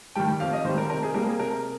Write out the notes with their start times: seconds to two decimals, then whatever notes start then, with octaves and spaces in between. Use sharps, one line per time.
0.15 D#3 G3 G5
0.40 F2 F5
0.53 D#5
0.65 D#3 C5
0.69 G3
0.78 A#4
0.90 C3 A#4
1.03 G#4
1.14 G3 A#3 A#4
1.28 G#4
1.39 C3 A#4